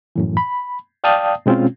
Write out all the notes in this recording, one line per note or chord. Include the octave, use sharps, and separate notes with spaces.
F#2 A2 E3
B5
D5 F5 G5 A5 D#6
B2 G#3 C4 C#4 F4